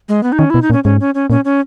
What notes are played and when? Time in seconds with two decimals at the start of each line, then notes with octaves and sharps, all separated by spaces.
0.09 G#3
0.23 B3
0.32 D#4
0.39 D#3 C#4
0.50 B2 E4
0.62 D#4
0.70 A#2
0.73 C#4
0.84 G#2 C#4
1.00 C#4
1.15 C#4
1.30 A#2 C#4
1.45 C#4